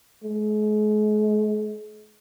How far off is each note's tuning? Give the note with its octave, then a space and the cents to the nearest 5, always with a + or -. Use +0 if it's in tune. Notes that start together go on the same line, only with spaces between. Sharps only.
G#3 +40